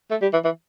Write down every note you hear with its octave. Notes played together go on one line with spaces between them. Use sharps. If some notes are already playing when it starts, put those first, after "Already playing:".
A3
G3
E3
E3